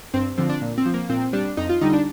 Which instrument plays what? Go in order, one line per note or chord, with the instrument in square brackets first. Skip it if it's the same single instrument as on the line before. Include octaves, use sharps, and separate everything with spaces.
[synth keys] G2 C4
D3 F3 C4
D4
A#2
C4
F3
A#3
A#2 C4
G3 D4
F2 D#4
F4
D3 G3 D#4
D4